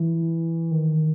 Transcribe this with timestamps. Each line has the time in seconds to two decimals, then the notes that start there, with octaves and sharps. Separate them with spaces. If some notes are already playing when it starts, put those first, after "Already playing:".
Already playing: E3
0.71 D#3